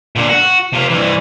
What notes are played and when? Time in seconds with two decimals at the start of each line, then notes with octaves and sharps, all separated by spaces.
0.16 A#2 D3
0.29 F#4
0.73 C3 F4
0.89 C2 E3